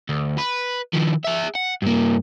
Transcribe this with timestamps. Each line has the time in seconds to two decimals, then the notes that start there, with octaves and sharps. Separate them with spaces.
0.09 D2
0.38 B4
0.94 D#3 F3
1.25 G#4 E5
1.55 F#5
1.82 G2 A#3